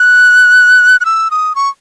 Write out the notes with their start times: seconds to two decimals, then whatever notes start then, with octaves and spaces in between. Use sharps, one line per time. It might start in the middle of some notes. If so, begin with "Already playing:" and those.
Already playing: F#6
1.01 F#6
1.05 E6
1.31 D#6
1.55 C#6